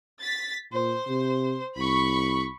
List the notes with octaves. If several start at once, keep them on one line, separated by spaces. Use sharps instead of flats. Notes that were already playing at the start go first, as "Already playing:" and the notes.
A6 B6
A#2 C5
C3
C2 B5 C#6